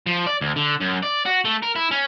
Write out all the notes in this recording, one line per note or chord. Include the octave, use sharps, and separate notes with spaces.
F3
D5
D2
D3
F#2
D5
F#4
A3
A#4
E4
C#4